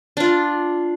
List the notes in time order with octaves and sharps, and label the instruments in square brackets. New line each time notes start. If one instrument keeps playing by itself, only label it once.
[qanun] D4 F4